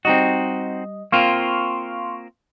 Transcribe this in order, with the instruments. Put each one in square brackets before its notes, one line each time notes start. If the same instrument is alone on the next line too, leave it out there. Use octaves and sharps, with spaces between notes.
[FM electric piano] G3 D#5 [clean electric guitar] C4 D#4 F#4
[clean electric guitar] A#3 C4 F4 [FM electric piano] F5 C6 C#6